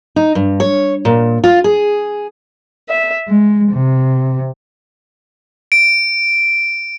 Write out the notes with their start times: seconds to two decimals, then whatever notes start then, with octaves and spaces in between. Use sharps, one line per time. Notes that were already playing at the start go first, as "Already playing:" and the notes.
0.16 D#4
0.35 G2
0.60 C#5
1.05 A#2
1.44 F4
1.64 G#4
2.89 E5
3.27 G#3
3.71 C3
5.72 D7